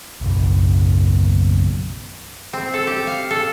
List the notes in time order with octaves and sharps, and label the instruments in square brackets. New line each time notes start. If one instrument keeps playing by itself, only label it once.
[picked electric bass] F#1 B1
[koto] C4
A4
G4
F5
A4